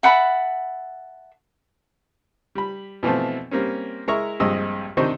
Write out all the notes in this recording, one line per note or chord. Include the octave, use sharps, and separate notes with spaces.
E5 F#5 A5 B5
G3 B5
B2 E3 F3 A3 C4
G3 A#3 C4 C#4
G#3 E4 A#4 E5 A#5 C#6
A#1 G2 G#3 C4 D#5 E6
C3 D#3 D4 C5 D#5 C#6